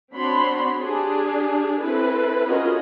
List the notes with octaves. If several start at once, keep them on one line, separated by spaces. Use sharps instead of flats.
C4 D4 F#4 C#5 B5 C6
D4 G4 G#4
C4 E4 A4 B4
C#4 F4 F#4 G#4 A#4 D#5